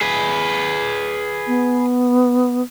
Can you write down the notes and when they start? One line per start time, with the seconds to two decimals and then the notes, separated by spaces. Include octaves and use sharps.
0.01 G#4 B4
1.47 B3